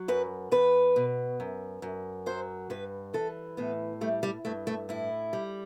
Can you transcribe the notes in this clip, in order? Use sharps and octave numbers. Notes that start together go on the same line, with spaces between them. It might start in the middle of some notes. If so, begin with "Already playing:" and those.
Already playing: F#3
F#2 B4
E2 B4
B2
F#2
F#2
F#3 C5
G2 B4
E3 A4
A2 B3
G3 A3
G3
G2 A3
A3
A2 E4
G3